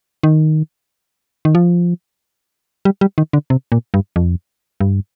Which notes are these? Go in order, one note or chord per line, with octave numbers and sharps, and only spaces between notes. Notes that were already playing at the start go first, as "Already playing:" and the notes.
D#3
D#3
F3
G3
G3
D#3
D3
C3
A#2
G2
F2
G2